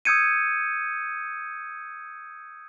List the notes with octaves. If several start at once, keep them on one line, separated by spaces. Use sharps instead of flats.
D#6 E6 G6 G#6 C#7 D#7